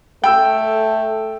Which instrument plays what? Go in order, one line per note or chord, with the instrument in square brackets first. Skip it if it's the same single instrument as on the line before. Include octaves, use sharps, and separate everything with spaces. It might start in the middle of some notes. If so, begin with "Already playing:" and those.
[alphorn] A3 [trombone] A4 [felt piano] G5 E6